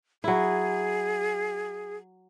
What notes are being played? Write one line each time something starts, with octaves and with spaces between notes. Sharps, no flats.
F#3 E4 G#4